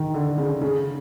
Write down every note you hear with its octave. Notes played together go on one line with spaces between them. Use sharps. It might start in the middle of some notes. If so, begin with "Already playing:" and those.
Already playing: D#3
D3
C#3
C#3